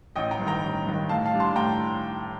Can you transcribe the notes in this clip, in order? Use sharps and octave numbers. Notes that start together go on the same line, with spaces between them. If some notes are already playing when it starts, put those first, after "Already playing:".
A1 D#5 G5
G5 A#5
G2 D#3
G5 A#5
A1
G2 D#3
A2 F5 A5
F5 A5
G3 D4
A5 C6
A2 G5 A#5